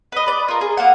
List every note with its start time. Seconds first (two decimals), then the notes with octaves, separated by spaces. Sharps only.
0.12 B4 D#5
0.26 B4 D5
0.48 F4 A#4
0.61 G#4
0.77 A#3 F5 F#5